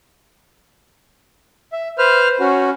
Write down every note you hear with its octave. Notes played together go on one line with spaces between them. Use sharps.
E5
B4 C5 F6
C#4 F#4